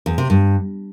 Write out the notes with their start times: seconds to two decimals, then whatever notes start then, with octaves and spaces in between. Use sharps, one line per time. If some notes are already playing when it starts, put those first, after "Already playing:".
0.06 E2
0.18 C3
0.30 G2